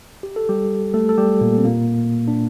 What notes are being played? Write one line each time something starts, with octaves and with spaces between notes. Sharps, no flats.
G4
A4
G3 G4
A3 A4
A4
G3 G4
A#2 A#3
C4
A#2 A#3
D4